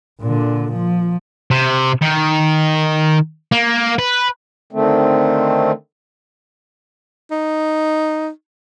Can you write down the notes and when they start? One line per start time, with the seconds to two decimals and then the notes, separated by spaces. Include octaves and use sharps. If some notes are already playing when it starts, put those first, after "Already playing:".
0.22 A#2 D3
0.73 F3
1.51 C3
2.01 D#3
3.52 A#3
3.99 B4
4.72 D3 D#3 A3 C4
7.31 D#4